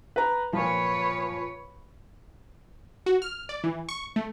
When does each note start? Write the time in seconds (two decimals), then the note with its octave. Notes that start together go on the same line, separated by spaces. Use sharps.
0.16 B4 A#5
0.53 A#2 F3 B4 C#5
3.06 F#4
3.22 F6
3.49 D5
3.64 E3
3.89 C#6
4.16 A3